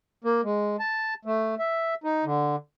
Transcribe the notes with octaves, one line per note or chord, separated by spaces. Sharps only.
A#3
G#3
A5
A3
E5
D#4
D3